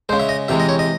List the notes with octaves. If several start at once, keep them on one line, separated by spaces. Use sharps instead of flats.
C#3 G#3 C5
E5
D#5
C3 E3 G#3 E5
D#5
C#5
D#5